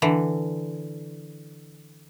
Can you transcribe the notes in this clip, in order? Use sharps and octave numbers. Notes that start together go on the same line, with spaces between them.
D3 E3